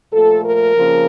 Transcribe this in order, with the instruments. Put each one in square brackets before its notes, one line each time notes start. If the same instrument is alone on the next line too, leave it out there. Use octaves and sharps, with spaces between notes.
[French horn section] A#2 F3 A3 A4
A#4
F2 C#3 F3 A#3